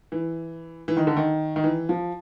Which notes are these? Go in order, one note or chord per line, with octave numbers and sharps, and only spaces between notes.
E3
E3
D#3
D3
D#3
D#3
E3
F3